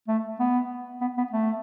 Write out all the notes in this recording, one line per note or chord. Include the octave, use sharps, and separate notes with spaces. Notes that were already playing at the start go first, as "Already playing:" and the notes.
A3
B3
B3
B3
A3